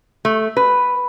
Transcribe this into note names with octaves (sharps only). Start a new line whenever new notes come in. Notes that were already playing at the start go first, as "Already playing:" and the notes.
A3
B4